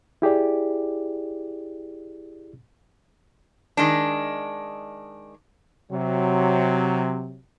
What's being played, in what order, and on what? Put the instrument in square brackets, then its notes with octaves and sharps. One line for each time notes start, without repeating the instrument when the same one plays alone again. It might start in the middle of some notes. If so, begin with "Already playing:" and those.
[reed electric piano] E4 G4 G#4 D5
[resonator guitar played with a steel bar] D#3 G#3 D4
[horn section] C3 F#3